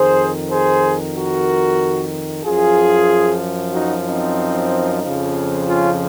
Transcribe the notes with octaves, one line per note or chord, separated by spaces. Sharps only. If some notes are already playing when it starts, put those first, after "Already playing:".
Already playing: F2 D#3 G#4 C5
G#4 C5
F#4 A#4
F#2 F3 F4 G#4
D#4 F#4
C4 D#4
F2 C#3 F3
C#4 F4